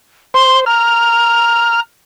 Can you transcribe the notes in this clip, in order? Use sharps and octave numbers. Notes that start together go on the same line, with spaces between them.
C5 C6
A#5 F6